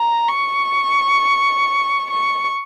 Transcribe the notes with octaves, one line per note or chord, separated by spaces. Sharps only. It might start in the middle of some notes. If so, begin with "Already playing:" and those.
Already playing: A#5
C#6
C#6